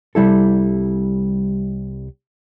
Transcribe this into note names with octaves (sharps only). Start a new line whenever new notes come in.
C2 G3 E4 A4